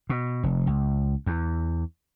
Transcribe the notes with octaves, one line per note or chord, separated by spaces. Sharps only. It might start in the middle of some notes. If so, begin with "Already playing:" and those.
B2
F1
C#2
E2